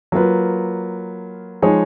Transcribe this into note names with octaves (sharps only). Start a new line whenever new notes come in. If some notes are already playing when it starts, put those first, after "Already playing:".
F#3 A#3 F4 B4
F3 G#3 D#4 G#4 C#5